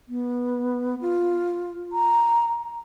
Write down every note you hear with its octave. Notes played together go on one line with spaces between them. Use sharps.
B3
F4
A#5